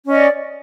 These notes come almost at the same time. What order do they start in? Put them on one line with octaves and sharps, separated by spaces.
C#4 D#5 D5